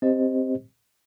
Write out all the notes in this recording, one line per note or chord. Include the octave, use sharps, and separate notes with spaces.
C4 G4 C5 D#5